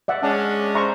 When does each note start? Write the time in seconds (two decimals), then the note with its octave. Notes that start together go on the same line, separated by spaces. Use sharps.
0.08 D5 E5 F#5
0.23 G#3 C#4 D4 A5
0.75 C5 E5 A#5 C#6